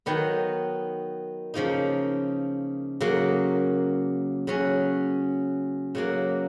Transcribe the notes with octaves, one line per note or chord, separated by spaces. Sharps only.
D#3 F#3 B3 D#4
C#3 F3 A#3 D#4
C#3 F#3 A#3
C#3 F#3 C#4
C#3 F#3 A#3